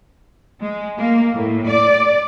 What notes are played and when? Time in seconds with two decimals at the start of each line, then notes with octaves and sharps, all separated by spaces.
0.62 G#3
0.98 A#3
1.33 A2
1.67 D5